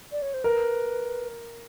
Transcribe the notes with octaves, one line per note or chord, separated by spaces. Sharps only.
D5
C#5
C5
A#4 B4